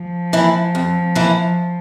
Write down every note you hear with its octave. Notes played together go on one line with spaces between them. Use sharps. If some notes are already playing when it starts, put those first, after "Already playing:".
Already playing: F3
E3 A#3 E4
F2
E3 A#3 E4